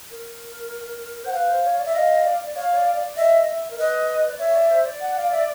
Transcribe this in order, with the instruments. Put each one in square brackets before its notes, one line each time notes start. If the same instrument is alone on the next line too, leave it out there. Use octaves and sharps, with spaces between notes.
[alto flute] A#4
[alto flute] C5 [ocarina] F#5
[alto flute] B4 [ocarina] F5
[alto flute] C5
C#5
D5
[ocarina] E5
[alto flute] D#5 [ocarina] F5
[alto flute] D5
D5
[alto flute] C#5 [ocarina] F5
[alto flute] C#5
D5
D5
[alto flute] D#5 [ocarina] E5
[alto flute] E5
A#4
[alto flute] B4 [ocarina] D#5
[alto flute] D5
[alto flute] C#5 [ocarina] E5
[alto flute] D5
C5
D5
[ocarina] F#5
F5
E5